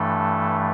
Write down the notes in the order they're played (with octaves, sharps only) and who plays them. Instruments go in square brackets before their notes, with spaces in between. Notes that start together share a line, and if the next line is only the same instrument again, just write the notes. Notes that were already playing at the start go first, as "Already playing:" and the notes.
Already playing: [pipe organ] G2 E3 A3 A4